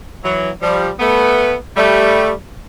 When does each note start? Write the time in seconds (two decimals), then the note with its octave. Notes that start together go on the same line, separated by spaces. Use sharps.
0.23 E3 F#3
0.62 F3 G3
1.00 A3 B3
1.77 G3 A3